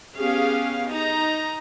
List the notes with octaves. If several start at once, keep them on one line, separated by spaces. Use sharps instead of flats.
B3 C#4 G4 G#4 F5
D#4 A#5